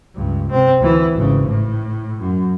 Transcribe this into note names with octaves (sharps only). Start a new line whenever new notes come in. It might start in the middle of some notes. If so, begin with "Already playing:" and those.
C#2 G2
C3 C4
D2 E3
G#1 C#3
A2
F#2